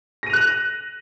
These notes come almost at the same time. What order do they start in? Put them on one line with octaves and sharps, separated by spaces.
A#6 D#7 F7 F#6